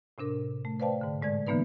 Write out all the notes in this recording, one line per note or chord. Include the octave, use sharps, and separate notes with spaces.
A2 C3 D4 A#4
A3
B4 C5 D5 F5 G5 A5
G#2 D3
A2 G#3 D5 G#6
D3 E3 A#3 B3 D#4 B4